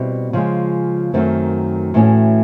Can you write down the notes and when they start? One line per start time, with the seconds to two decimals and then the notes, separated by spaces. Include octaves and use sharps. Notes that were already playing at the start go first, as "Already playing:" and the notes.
Already playing: B2 G3 C4 E4
0.33 C#3 F3 G#3
1.13 F#2 D#3 F#3 A3 C4
1.94 A2 E3 A3 C#4 F#4